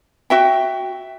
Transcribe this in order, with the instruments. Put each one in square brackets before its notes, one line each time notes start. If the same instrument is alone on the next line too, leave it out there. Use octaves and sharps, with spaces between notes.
[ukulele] F#4 E5 G5